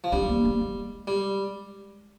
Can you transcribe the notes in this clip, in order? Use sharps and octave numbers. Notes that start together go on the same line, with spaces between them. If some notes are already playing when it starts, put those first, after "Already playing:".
F3
G3 D4
A#3
A#3
G#3
G3